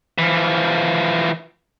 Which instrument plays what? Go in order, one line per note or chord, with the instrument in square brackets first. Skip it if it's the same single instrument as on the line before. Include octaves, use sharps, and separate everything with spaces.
[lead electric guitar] E3 F3